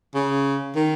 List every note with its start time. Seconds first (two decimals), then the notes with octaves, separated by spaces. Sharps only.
0.15 C#3
0.76 D#3